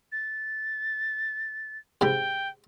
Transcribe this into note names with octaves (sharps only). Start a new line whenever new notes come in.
A6
G#2 C3 G5 B5